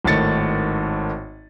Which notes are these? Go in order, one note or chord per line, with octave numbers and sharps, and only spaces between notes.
G#1 A2 D#3 A6 C#7